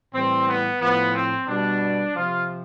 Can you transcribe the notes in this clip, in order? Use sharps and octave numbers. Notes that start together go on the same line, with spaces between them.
A2 E3 G3 C4
B3
A2 F3 B3
C4
B2 G3 D4
C3 F3 F4